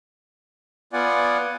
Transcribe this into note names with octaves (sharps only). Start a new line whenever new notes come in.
B3 F4 D5 F#5 G#5